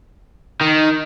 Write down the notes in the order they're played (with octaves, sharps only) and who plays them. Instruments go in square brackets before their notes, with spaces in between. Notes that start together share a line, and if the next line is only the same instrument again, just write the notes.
[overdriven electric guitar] D#3